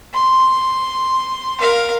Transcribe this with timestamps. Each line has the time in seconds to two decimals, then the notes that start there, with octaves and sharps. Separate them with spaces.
0.13 C6
1.60 A#4 F5